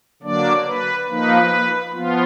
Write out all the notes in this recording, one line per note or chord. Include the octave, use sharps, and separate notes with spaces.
D3 F#3 A#3 D4 D5
B4
F3 A#3 D#4 B4
F3 B3 F4